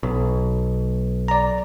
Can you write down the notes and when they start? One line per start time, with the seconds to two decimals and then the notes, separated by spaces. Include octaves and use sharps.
0.03 B1
1.28 D5 A#5